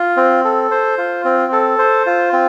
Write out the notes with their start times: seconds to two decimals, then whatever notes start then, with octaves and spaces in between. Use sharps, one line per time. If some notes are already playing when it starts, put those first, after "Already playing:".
Already playing: F4
0.17 C4
0.44 A4
0.71 C5
0.98 F4
1.25 C4
1.52 A4
1.79 C5
2.06 F4
2.33 C4